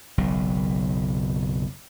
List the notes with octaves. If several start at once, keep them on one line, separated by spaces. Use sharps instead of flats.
F#1 B1